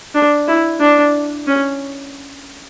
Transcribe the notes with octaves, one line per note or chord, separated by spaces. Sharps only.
D4
E4
D4
C#4